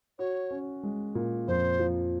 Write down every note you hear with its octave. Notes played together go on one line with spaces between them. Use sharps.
F#4 C#5
C#4
G#3
A#2
F2 C5
F3